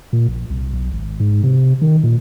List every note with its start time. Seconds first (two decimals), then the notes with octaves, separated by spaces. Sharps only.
0.13 A#2
0.28 A#1
0.50 C2
0.73 B1
0.92 G#1
1.20 G#2
1.44 C3
1.82 D#3
2.04 A#2